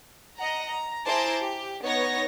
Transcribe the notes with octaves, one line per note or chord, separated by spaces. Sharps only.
D#5 F#5 A#5
A#5
E4 G#4 C5 A5 A#5 D6
G4
B3 D#4 C#5 A#6